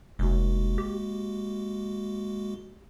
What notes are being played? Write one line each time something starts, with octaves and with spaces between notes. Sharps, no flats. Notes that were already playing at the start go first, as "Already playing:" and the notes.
F1 G#3 A#3 F#4
G4